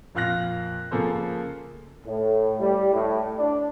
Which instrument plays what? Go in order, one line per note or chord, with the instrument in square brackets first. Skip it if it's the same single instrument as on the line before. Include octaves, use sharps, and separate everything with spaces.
[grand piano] F2 A#2 F5 F6 F#6 A#6
C#3 F3 A#3 G#4 A4 C5
[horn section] A2
G3
A2
D4